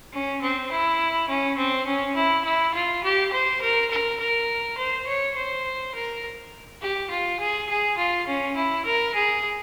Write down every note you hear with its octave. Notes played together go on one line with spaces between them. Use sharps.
C#4
C4
E4
C#4
C4
C#4
E4
E4
F4
G4
C5
A#4
A#4
A#4
C5
C#5
C5
A#4
G4
F4
G#4
G#4
F4
C#4
E4
A#4
G#4